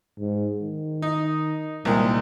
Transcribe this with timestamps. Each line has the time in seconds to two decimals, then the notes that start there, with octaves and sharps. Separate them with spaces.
0.19 G#2
0.61 D#3
1.02 D#4
1.85 C2 A#2 D#3 G#3